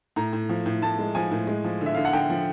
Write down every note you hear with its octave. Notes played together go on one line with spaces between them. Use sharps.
A2 A#5
A2
F3
A2
A2 A5
G#3
F3 G#5
A2
G#3
F3
D3 E5
D3 F5
F#5
D3 G5
F3